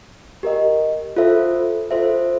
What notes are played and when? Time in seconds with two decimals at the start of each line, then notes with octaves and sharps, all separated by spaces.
0.43 G4 A#4 D#5
1.16 F4 A4 C5 E5
1.91 F4 A4 C5 E5